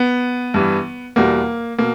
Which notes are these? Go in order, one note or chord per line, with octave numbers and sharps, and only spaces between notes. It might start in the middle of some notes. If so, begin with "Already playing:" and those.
Already playing: B3
G2 E3 G3
E2 B2 G3 A#3
B2 A#3